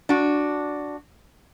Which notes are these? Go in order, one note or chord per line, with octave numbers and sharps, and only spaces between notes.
D4 F#4